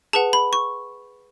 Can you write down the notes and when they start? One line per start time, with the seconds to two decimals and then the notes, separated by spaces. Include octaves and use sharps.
0.13 G#4 B4 F#5 A5
0.33 B5
0.53 C#6